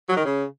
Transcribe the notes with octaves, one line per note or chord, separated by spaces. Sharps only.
F#3
D#3
C#3